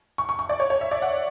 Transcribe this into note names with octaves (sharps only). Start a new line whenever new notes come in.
C#6
C#6
C#6
D5
C#5
C#5
E5
D5
F#5